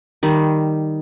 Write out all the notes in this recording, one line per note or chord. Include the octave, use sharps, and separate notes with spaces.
D#3 G3